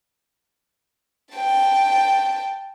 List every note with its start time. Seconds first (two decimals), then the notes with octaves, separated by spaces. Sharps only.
1.35 G5 A5